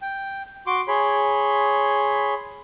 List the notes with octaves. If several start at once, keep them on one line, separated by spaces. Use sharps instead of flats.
G5
F#4 C6 D6
G#4 C#5 B5 C6